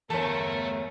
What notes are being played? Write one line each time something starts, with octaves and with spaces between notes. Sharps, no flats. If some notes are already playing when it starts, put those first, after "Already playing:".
G1 E2 A3 A#4 C#5 A5